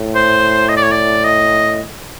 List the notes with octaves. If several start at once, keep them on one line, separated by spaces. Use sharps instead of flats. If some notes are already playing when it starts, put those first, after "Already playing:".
Already playing: A2
C5
D#5
D5
C#5
D5
D#5